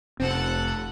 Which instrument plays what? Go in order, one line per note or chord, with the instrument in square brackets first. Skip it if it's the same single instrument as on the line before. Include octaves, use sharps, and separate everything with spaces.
[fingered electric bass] F1 [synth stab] C4 [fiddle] A4 F#5